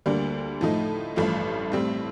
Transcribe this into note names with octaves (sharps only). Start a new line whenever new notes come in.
D2 D3 G3 A#3
A2 F3 A3 D#4
A1 G2 F3 A3
A2 G3 C4